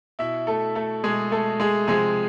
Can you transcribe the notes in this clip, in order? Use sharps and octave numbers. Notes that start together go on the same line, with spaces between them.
B2 E4 E5
A3 A4
A3 A4
B2 G#3 G#4
A3 A4
G#3 G#4
C3 F3 G#3 G#4